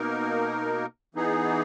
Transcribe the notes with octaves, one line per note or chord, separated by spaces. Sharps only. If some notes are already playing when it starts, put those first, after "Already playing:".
Already playing: B2 A#3 D#4 A#4
E3 B3 D#4 G#4